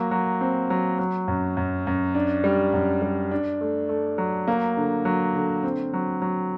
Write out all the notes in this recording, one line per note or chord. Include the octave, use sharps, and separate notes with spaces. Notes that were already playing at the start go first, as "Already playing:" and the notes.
Already playing: F#3 A#3
F#3
C4
F#3
F#3
F#2
F#2
F#2
D4
G3
F#2
G3
D4
A3
A3
F#3
A#3
D3
F#3
D3
C4
F#3
F#3